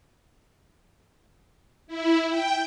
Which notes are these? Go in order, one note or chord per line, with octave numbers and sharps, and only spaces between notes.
E4
G5